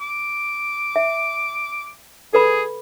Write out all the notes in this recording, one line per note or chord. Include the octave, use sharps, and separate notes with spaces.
D6
E5
G#4 A4 B4 B5